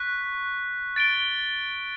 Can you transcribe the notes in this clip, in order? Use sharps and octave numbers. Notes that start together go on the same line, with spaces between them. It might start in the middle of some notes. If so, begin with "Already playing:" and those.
Already playing: C#6 F#6 B6
A6 D7 G7